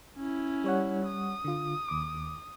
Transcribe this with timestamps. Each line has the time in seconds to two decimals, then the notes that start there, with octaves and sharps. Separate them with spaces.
0.17 C#4 E4
0.64 G3 C#5 F#5
1.06 D#6
1.45 D3 F4
1.88 D#2 D6